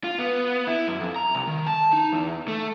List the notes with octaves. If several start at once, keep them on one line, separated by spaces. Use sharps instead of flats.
F4
B3
E4
F#2
F2
A#5
C2
D#3
A5
D#4
E2
A3